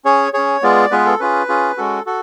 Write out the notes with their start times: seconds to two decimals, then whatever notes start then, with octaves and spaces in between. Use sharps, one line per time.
0.05 C#4 G#4 C#5
0.33 C#4 G#4 C#5
0.63 G#3 B3 F4 G#4 D5
0.91 G#3 B3 F4 G#4 B4
1.06 A4
1.20 C#4 F4 G#4 B4
1.49 C#4 F4 G#4
1.77 G#3 C#4 F#4 A4
2.06 F#4 A4